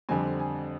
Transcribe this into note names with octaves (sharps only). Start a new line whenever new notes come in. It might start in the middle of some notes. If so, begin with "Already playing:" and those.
F2 D3 G3 C4 G#5
G#5